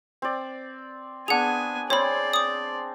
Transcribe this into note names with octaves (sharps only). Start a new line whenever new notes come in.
C4 D5
B3 D4 G#4 F#5 G#5 F7
C4 C#5 D5 G#5 B5 C6
D6 D#6